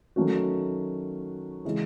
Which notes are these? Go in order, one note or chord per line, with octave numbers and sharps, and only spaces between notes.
D#3 F#3 A3 C#4 F#4
C#3 E3 G#3 C#4